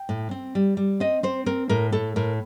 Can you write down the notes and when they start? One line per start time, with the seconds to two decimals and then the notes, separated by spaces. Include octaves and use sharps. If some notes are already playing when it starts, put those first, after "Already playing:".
Already playing: G5
0.09 A2
0.31 C4
0.55 G3
0.77 G3
1.00 C4 D#5
1.23 C4 C5
1.46 C4 A#4
1.69 A2 A#4
1.92 A2 A4
2.16 A2 A#4